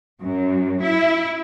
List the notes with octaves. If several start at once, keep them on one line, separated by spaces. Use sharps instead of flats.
F#2
E4